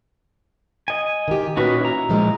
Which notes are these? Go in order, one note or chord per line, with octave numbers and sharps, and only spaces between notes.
D#5 G#5
D#3 G4
A#2 C#4 D#4 F#4 B4
E4 A#5
A#2 F3 G#3